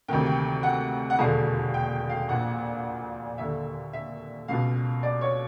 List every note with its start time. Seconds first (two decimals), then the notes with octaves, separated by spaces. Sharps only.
0.08 D2 C3 D#3 G5
0.26 G5
0.63 F#5
1.10 F#5
1.19 E1 D#2 D3 F5
1.74 G5
2.10 F5
2.28 A#1 A#2 F#5
3.38 D#2 D3 E5
3.93 E5
4.48 C#2 B2 F5
5.03 D5
5.21 C#5